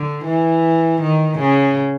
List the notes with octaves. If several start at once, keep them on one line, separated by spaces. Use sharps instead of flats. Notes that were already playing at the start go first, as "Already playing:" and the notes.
Already playing: D3
E3
D#3
C#3